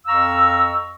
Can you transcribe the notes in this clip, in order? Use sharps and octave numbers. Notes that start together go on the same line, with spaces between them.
F2 F5 A#5 C#6 E6